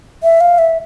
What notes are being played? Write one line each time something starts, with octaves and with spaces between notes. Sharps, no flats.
E5
F5
E5